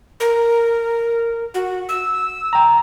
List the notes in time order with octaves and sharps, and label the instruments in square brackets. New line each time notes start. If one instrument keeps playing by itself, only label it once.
[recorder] A#4
F#4
E6
[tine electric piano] G5 A#5